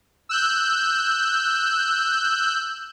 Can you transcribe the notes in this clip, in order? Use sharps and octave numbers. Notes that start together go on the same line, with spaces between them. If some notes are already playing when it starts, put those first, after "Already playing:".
E6 F#6 G6